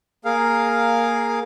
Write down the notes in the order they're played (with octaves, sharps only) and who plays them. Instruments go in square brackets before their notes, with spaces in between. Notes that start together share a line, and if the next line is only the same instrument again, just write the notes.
[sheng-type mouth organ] A#3 G#4 A#4 F5